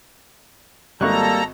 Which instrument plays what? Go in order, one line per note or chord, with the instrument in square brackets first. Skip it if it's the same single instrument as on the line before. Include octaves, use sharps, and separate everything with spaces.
[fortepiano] G#1 C#6 F#6 [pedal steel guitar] G3 A#3 [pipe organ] A4 A#5